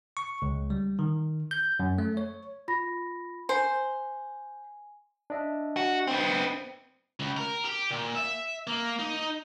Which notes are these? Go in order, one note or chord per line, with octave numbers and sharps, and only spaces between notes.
C#6
C#2
G3
D#3
G6
F#2
A3
C#5
F4 B5 A#6
C5 G#5
D4 D#5 E5
F#4
B3 C4
C#2
A#4
G4
A#2
E5
A#3
D#4